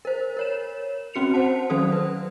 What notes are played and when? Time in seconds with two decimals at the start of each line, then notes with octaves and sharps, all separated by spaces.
0.05 A#4 C5
0.37 A#4 C#5 E7
1.14 C4 C#4 F#4 C#7 F7
1.34 C5 F#5 A5
1.70 D#3 F#3 C#4 A4 C5 D#6
1.92 B4